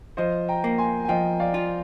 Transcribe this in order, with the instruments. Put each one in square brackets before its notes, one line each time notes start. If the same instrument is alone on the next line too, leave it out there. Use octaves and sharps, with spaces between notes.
[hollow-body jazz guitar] F3 [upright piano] C5 D#5
[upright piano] G5 A#5
[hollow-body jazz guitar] A#3
[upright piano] G#5 C6
G#5
[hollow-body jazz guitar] F3 [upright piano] D#5 G5
[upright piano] D5 F5
[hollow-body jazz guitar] F4